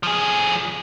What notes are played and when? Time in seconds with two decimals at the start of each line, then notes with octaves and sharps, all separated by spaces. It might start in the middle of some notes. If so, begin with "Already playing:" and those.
0.03 F3 G#4